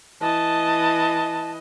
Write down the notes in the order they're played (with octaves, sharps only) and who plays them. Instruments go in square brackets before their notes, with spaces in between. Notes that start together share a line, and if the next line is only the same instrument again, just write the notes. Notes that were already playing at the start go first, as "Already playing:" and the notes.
[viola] E3 D#5 [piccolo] A5